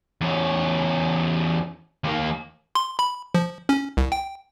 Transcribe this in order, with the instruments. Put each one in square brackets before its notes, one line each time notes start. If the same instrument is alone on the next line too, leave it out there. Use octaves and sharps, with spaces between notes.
[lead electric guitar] E2 C#4
D#2 A#3
[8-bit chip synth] C6
B5
F3
C#4
C2
G5